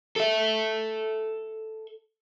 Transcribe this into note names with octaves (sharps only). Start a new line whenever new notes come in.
A4 E5